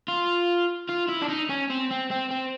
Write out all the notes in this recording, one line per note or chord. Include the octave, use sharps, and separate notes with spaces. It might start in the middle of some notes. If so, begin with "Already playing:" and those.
F4
F4
E4
D4
D#4
C#4
C4
C4
C4
C4